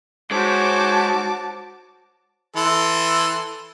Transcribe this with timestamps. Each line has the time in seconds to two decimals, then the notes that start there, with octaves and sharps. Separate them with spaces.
0.31 G#2 G#3 F#4 C5 C#5 A5 D6
2.56 E3 A4 C6